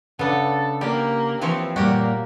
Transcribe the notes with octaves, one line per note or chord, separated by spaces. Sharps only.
C#3 B3 D4 A4
A#3 G4
E3 F3 C4 C#5
A#2 G3 A#3 F#4 G4